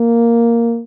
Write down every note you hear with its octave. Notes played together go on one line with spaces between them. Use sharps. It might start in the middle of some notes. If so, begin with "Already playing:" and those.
Already playing: A#3